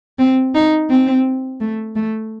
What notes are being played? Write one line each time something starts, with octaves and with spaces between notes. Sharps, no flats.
C4
D#4
C4
A3
A3